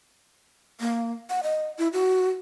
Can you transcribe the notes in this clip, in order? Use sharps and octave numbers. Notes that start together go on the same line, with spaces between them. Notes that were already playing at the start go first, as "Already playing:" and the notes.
A#3
F#5
D#5
E4
F#4